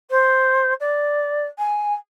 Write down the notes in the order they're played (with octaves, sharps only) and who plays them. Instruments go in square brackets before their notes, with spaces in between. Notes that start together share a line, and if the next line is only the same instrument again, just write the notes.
[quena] C5
D5
G#5